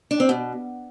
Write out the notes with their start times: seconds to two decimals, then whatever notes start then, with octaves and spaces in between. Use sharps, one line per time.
0.11 D4
0.20 C4
0.29 B2